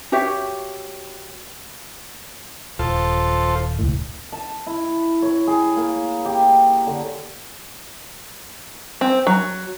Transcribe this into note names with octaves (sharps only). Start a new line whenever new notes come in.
F#4 G4 C#5 E5
D#1 F4 A4 C5
E1 C#2 A2
A5
E4
C#5
G#4
A#3
G4
D3
C4
F#3